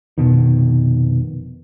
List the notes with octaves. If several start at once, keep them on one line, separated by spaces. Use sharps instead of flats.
F1 C#2 B2 D#3